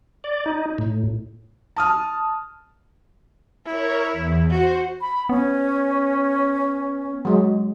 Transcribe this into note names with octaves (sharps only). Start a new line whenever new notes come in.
D5
D#4
A2
A5 D#6 F6
E4 A#4 C#5
E2
F#4 C5
B5
B3 C#4
F#3 G#3